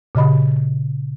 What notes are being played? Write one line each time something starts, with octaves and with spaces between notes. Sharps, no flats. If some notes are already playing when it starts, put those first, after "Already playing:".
A#2 C#3 D#5 B5